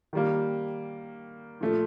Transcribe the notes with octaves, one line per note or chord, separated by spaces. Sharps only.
D#3 G3 A#3
A#2 F3 A3